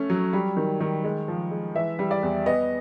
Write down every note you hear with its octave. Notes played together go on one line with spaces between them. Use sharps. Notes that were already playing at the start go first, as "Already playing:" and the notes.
Already playing: A3 C#4
F#3
G3
D#3
D#3
G#3
F3
G#3
E3 E5
G3
D5
E2
B3 D#5